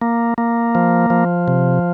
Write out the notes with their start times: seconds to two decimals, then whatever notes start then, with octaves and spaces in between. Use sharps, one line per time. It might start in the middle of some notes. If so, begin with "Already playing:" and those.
0.01 A#3
0.38 A#3
0.75 F3
1.10 F3
1.48 C3